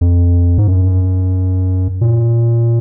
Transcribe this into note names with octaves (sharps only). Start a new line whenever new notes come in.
F2
G#2
F#2
A#2